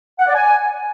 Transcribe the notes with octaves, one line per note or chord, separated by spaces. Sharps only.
F#5
D5
G#5